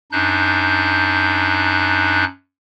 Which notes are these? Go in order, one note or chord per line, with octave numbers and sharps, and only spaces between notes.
F#2 D4 D#4 F#6 G6